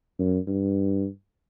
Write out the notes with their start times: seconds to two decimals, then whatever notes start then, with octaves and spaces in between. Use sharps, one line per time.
0.19 F#2
0.47 G2